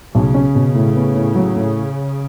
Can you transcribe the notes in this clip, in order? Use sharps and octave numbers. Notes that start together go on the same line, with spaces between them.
B1 C#3
C#4
B2
A2
B3
A2
F#3
A2